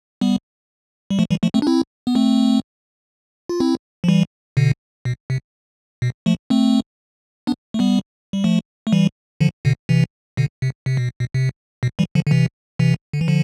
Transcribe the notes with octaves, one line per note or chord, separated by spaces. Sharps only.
G3 B3
G3
F3 A3
E3 G3
F3 A3
A3 C4
D4
C4 E4
B3
A3 C4
F4
C4 E4
F3
E3 G3
B2 D3
B2
C3
B2
F3 A3
A3 C4
B3 D4
A3
G3 B3
G3
F3 A3
A3
E3 G3
D3 F3
B2 D3
C3 E3
B2 D3
C3
C3
B2
B2
C3
B2
E3 G3
D3 F3
D3
C3 E3
C3 E3
D3
E3
D3 F3